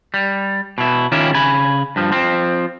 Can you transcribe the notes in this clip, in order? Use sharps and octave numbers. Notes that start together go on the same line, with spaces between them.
G3
B2 E4
D#3 C#4 E4 F4 G4
C#3 G#5 B5
G2 F3
F3 C4